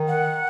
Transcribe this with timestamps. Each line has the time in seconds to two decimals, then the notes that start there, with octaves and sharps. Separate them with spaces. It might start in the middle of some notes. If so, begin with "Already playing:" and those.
Already playing: D#3
0.08 F#5